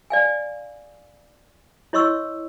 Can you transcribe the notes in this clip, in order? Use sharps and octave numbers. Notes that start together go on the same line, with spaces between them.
D5 F5 G#5
E4 C#5 D#5 C6 C#6 E6